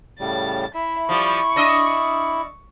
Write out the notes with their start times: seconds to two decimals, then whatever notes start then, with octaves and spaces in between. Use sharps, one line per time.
0.20 A2 C#3 G3 A6
0.75 E4 E5
1.09 F3 G3 C#6
1.56 D4 D#5 E5